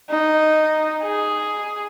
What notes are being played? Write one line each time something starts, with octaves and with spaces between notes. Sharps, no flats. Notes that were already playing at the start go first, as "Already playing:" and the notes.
D#4
G#4